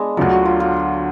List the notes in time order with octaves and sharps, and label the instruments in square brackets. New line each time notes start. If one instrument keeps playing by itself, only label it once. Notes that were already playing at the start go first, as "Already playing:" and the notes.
Already playing: [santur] G#3 B3 D4
[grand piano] D2 D3 F#3 [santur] F4
[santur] F#4
F4
F4